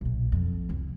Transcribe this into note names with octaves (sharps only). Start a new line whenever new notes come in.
B1 A#2
F2
C2 F4